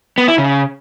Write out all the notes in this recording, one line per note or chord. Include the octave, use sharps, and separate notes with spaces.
B3
E4
C#3